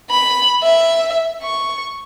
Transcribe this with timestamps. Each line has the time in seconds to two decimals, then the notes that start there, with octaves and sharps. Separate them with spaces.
0.10 B5
0.63 E5
1.43 C#6